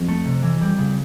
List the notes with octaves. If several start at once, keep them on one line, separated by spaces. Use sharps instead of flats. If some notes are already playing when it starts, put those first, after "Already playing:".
Already playing: F2
A3
C3
E3
G3
C#3